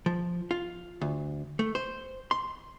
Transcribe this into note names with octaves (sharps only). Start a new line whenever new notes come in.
F3
F4
D2
A3
C5
C6